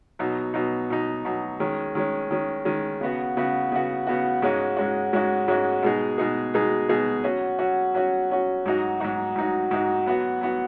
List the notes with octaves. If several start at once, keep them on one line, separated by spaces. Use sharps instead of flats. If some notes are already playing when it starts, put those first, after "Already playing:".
B2 F#3 D#4
B2 F#3 D#4
B2 F#3 D#4
B2 F#3 D#4
D#3 G#3 C#4
D#3 G#3 C#4
D#3 G#3 C#4
D#3 G#3 C#4
C#3 B3 F#4
C#3 B3 F#4
C#3 B3 F#4
C#3 B3 F#4
G#2 G#3 C#4 F#4
G#2 G#3 C#4 F#4
G#2 G#3 C#4 F#4
G#2 G#3 C#4 F#4
B2 G#3 D#4 G#4
B2 G#3 D#4 G#4
B2 G#3 D#4 G#4
B2 G#3 D#4 G#4
F#3 C#4 F#4
F#3 C#4 F#4
F#3 C#4 F#4
F#3 C#4 F#4
G#2 F#3 D#4 F#4
G#2 F#3 D#4 F#4
G#2 F#3 D#4 F#4
G#2 F#3 D#4 F#4
F#3 B3 F#4
F#3 B3 F#4